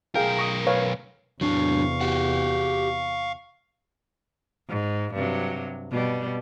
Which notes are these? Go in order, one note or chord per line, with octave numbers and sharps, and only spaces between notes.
B1 G#4 A#4 F5 G5
A#5 C#6 D#6
B4 C#5 F5
E2 C3 F#3 D4 F5 C#6
F#4 G4 F#5
G#2
G2 C3 F#3
B2 G3